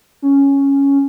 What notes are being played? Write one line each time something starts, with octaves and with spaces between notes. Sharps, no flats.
C#4